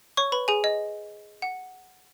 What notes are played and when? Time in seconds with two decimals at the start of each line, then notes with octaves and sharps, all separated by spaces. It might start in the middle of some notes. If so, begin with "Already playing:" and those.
0.17 C#5 C#6
0.32 B4 B5
0.48 G#4 G#5
0.64 D#5
1.42 F#5